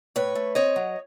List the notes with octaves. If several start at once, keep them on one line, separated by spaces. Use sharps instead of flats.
A2 B4 C#5
A3
C4 C#5 D#5
F#3